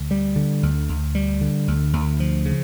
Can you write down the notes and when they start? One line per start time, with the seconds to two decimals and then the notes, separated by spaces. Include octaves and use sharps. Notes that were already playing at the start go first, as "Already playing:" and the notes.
Already playing: D2
0.11 G3
0.36 D3
0.63 D2
0.89 D2
1.15 G3
1.41 D3
1.68 D2
1.93 D2
2.20 F3
2.45 C#3